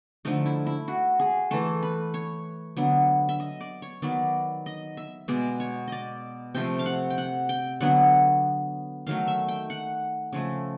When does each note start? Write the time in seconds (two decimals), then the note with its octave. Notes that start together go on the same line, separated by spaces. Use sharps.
0.25 D3 F3 A3 D#4
0.46 E4
0.66 E4
0.88 F#4
1.20 G#4
1.51 E3 A3 A4
1.82 B4
2.14 C#5
2.76 D3 F#3 B3
3.29 E5
3.40 D#5
3.61 D5
3.82 C#5
4.02 D#3 F#3 B3 D5
4.66 D#5
4.97 E5
5.28 B2 G#3 B3 D5
5.60 C#5
5.87 D5 D#5
6.54 C3 F3 A3 G5
6.79 F5
6.86 F#5
7.10 G5
7.18 F#5
7.49 G5
7.80 D3 F#3 B3 F#5
9.07 D#3 F#3 A3 F5
9.28 E5
9.48 G5
9.70 F#5
10.33 C#3 F3 A3